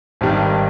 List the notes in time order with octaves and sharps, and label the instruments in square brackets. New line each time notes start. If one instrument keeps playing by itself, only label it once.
[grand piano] G#1 G2 D#3 G3